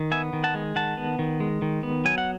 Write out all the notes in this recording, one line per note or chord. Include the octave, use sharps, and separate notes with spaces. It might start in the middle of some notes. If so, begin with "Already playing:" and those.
Already playing: D#3
B3 E5 G#5
D#3
F#5 A5
G#3
D#3 F#5 A5
B3
D#3
G#3
D#3
B3
F#3 G#5
F#5